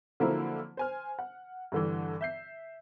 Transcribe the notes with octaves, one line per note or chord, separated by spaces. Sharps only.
D3 F3 F#3 A#3 C4 E4
C5 G#5 F6
F#5
G2 D3 E3
E5 G6 C7